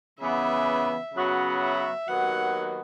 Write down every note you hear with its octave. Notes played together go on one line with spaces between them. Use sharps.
C#3 E3 B3 E5
C#3 F#3 B3 F#4
E5
D#2 D#3 F#3 B3 F#4 F#5